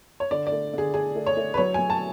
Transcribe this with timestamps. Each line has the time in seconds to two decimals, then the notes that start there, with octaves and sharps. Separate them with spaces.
0.20 C#5
0.31 D3 D5
0.47 D5
0.52 A3
0.74 D3 G#4
0.94 D4 G#4
1.16 A3
1.27 C#5
1.37 A3
1.54 B4
1.58 F#3 C#5
1.74 F#3 G#5
1.90 A5